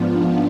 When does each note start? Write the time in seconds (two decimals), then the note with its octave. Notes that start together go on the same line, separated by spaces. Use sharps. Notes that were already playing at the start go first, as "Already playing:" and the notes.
Already playing: G#2 F3 B3 D4 F4